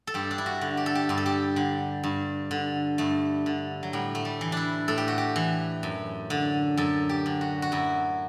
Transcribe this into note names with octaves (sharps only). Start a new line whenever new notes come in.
A4
G2 G4
D4
E4
F#4
D3
G4
A4
G4
G2 G4
A4
G4
D3
G2
D3
G2 A3
D3
F#3
A2 G3
A3
G3
E3
D4 E4
A2 A4
G4
F#4
G4
E3
F#2
D3
F#2 A4
G4
D3
F#4
F#4
F#2 E4